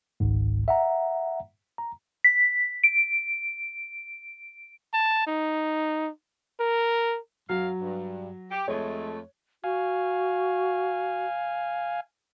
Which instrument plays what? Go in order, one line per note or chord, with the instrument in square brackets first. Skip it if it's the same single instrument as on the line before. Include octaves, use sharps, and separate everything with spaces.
[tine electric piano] G#1 C#2 G#2
E5 F#5 A#5
A#5
[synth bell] B6
D7
[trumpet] A5
D#4
A#4
[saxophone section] F#2 F5 [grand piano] F#3
[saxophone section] G2
G4
[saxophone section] F2 G#3 A3 [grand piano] C#5
[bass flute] F#4 [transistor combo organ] F5 G#5